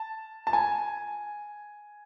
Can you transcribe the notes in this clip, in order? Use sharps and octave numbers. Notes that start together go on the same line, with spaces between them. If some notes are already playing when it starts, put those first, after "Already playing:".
Already playing: A5
A5
G#5